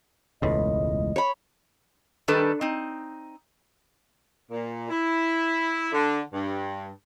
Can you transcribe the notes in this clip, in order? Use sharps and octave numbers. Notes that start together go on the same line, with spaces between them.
E1 C#2 A2 D#5
C#5 B5
D#3 G3 D4 A4 B4
C4 D#4
A#2
E4
D3
G2